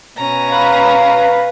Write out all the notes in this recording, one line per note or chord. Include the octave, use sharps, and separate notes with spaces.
B2 C#4 A#5
B4 F5